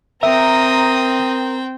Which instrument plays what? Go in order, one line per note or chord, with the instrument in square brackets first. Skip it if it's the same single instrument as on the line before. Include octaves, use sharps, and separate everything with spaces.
[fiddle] C4 G5 [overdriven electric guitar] A#4 [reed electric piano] E5 [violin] A#5 D#6